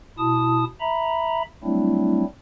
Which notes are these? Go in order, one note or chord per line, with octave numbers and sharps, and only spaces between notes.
B2 E4 A5 D#6
E5 A#5 B5
F#3 G3 A3 C4 D4 E4